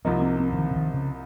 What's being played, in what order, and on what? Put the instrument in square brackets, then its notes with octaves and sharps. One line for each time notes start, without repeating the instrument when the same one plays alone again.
[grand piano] C2 C3 F3 A#3 D#4 [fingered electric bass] C4
[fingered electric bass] C4
C4
C#3
D#3
C#3
D#3
C#3